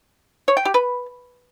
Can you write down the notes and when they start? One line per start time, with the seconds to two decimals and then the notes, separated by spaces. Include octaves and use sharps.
0.48 C#5
0.57 G5
0.65 G4
0.74 B4